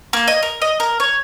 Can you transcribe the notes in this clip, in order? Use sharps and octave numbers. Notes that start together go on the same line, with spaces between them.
A#3
D#5
A#4
D#5
A#4
C#5